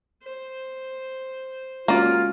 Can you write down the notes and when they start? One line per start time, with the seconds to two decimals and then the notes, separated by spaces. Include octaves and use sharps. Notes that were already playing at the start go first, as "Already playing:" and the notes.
0.23 C5
1.88 G#3 A#3 C#4 F4 F#4 D5